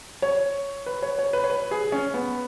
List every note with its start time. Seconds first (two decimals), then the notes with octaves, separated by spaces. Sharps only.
0.22 C#5
0.86 B4
1.02 C#5
1.19 C#5
1.33 B4
1.44 C#5
1.50 B4
1.71 G#4
1.92 C#4
2.14 B3